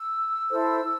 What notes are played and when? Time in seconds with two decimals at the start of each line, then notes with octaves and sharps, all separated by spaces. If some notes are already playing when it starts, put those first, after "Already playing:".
Already playing: E6
0.50 E4 A4 C5